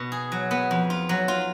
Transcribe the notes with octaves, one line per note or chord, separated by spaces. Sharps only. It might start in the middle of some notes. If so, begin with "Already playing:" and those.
Already playing: B2
G#4
F#3
B3
F2
F4
F#3
F4